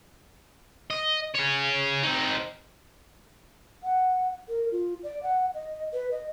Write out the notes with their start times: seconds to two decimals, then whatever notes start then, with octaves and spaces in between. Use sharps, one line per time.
0.90 D#5
1.35 G#4 C#5
2.04 C4 D#4
3.84 F#5
4.49 A#4
4.72 F4
5.03 D5
5.23 F#5
5.54 D#5
5.93 B4
6.11 D#5